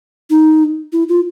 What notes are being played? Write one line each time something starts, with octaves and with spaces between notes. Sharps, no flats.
D#4
E4
F4